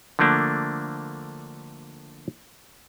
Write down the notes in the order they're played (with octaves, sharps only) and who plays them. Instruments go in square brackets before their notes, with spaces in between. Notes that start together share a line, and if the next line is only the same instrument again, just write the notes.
[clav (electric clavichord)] D3 F3 A3 A#3 D4